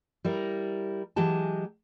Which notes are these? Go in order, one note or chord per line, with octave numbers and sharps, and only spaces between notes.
G3 E4 A#4
E3 F#3 G#3 G4 A5